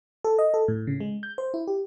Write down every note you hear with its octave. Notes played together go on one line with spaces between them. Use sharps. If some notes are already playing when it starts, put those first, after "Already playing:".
A4
D#5
A4
A2
C#3
G#3
G6
C5
E4
G4